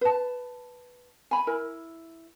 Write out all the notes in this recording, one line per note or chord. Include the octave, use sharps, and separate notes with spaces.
B4 A5
G#5 B5
E4 A#4